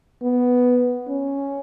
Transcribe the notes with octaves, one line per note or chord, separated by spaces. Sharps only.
B3
C#4